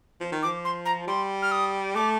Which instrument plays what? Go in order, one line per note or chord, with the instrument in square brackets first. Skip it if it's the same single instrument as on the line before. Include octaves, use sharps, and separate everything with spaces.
[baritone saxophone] F3
D#3
[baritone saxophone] F3 [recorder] D6
[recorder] C6
A#5
[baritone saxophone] G3 [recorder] C6
[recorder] F6
D#6
[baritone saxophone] A3 [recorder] D6